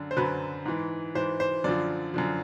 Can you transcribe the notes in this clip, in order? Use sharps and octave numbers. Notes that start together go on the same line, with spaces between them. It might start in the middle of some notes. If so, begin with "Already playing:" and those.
Already playing: F#2 D3
C5
F#2 D3 F#3 B4
G#2 E3
G#2 E3 C5
C5
F#2 D3 F3 D5
F#2 D3 F3